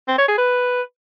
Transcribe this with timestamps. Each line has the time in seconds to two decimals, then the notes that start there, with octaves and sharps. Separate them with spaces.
0.08 C4
0.18 C#5
0.28 G#4
0.38 B4